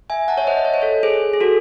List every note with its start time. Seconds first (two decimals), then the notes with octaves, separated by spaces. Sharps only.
0.10 E5 G#5
0.28 F#5 A5
0.37 C#5 E5
0.47 C5 D#5
0.57 D#5
0.65 C#5
0.74 C5
0.82 A4 C#5
1.03 G#4 C5
1.33 G#4
1.40 F#4 A4